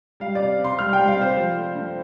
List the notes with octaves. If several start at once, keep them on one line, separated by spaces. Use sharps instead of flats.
G3 F5
C3 D5
C3
C6
G3 F6
G5
G3
F5
C3 C5
F3
A3
G2